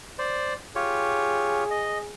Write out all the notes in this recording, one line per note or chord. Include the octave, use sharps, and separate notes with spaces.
C5 D5
F4 G4 G#4 C#5
D#5